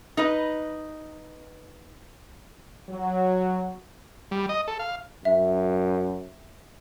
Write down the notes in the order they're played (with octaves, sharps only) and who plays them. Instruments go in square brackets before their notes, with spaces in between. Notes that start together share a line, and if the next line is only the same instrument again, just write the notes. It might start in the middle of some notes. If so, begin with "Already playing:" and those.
[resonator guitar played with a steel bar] D#4 B4 D#5
[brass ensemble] F#3
[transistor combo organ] G3
D#5
A4
F5
[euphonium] F#2 [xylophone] E5